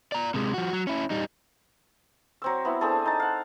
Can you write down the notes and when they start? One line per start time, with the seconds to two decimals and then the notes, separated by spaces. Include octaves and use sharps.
0.12 D5 A#5
0.34 C3 G#3
0.54 F3 F#4
0.73 F#3
0.87 C#4 E4
1.10 G3 D#4
2.42 F#3 C4 E6
2.65 B3 E4
2.81 C4 D4 G#4 A4
3.06 D#4 A5
3.20 F5 F#5